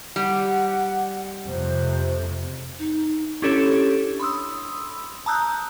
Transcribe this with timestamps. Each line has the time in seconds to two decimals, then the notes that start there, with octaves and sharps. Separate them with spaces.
0.16 G3 F#5
1.46 F2 C3 A3 C5
2.79 D#4
3.42 C#4 D4 E4 G4 A4 C#5
4.20 B5 C6 D#6 E6
5.26 A5 A#5 D#6 E6 F#6 G6